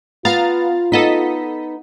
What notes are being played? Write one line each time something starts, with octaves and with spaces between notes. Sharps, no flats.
B3 F4 F5 A#5 A6
B3 D#4 A4 D#5 B6